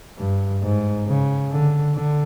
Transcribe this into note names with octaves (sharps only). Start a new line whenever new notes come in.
G2
G#2
C#3
D3
D3